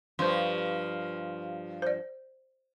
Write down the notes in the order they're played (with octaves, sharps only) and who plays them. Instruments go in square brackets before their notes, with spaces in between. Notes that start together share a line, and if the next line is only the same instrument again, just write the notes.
[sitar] G2 F3 [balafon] C5 C6
[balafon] C5 D5